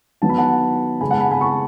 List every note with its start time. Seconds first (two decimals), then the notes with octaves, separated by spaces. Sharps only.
0.22 D#3 F#3 B3 A5
0.29 B5
0.38 F#5 A5
1.01 C#3 G#3 B3 G#5 B5
1.11 F#5 A5
1.20 G#5 B5
1.31 G#5 B5
1.41 A5 C#6